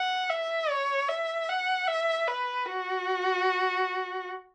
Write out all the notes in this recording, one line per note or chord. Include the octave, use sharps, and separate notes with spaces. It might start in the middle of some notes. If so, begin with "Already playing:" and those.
Already playing: F#5
E5
C#5
E5
F#5
E5
B4
F#4